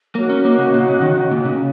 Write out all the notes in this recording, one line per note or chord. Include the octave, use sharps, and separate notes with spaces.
A#3 D#4 F#4 C#5
C#4
A#3
C#3
A#2
C#3
D#3
C#3
A#2
C#3